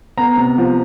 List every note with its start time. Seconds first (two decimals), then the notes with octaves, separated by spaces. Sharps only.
0.17 B3 A#5
0.37 C3
0.58 F3